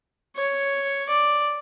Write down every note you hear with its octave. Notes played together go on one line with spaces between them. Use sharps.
C#5
D5